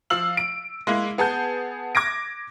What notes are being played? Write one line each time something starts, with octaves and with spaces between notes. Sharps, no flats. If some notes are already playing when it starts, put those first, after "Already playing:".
F3 F5 E6 F#7
D7
G#3 A#3 E4
B3 G#4 A5 G6
D6 G#6 A#6 D7